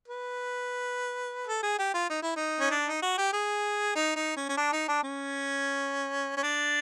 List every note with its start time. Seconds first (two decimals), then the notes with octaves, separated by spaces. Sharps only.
0.08 B4
1.47 A4
1.63 G#4
1.79 G4
1.94 F4
2.10 D#4
2.22 E4
2.36 D#4
2.60 C#4
2.71 D4
2.86 D#4
3.02 F#4
3.17 G4
3.33 G#4
3.95 D#4
4.16 D#4
4.37 C#4
4.49 C#4
4.57 D4
4.73 D#4
4.88 D4
5.03 C#4
6.37 C#4
6.43 D4